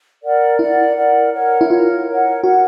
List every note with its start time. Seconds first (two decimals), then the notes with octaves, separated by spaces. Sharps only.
0.23 A#4 D5 F#5
0.59 E4 A#4 D5 F#5
0.95 A#4 D5 F#5
1.33 A#4 C#5 F#5
1.61 E4
1.69 F4 A#4 C#5 F#5
2.07 A#4 C#5 F#5
2.43 F#4 A#4 C#5 F#5